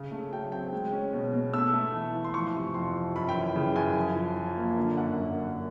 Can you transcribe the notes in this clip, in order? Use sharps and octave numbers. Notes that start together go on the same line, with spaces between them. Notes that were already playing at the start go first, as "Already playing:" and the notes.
Already playing: C#3
A3
F#3 G5
C4 G5
G#3
C#4
B2
B2
A3 E6
A3
E3
E3
C6
F3 C#6
C3
F2 C6
F3
F#2 B5
G5
E3
C#3
F#2 G#5
F3
F3
F3
A#3
D3
F#2 F#5
F#2
F#2